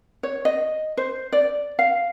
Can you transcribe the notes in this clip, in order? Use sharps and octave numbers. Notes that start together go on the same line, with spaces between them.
C#5
D#5
C5
D5
F5